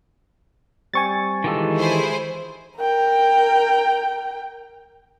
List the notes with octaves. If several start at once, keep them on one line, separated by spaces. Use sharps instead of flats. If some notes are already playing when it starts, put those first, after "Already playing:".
G3 C4 G#5 C#6 A6
D#3 E3 G#3 F4 G4 A4
E4 G#4 C5
A#4 G5